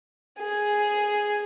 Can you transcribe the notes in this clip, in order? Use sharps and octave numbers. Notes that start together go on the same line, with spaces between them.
G#4